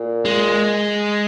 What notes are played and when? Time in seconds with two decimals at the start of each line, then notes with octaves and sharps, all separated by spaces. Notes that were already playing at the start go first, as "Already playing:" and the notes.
Already playing: A#2
0.25 G#3